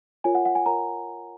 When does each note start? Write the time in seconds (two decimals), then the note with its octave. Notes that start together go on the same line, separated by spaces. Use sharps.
0.24 F4 A#4 C#5 G#5
0.35 F#5
0.45 F#5
0.55 G#5
0.66 F4 A#4 C#5 A#5